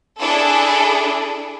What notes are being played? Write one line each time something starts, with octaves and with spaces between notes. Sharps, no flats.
D4 E4 G#4 A4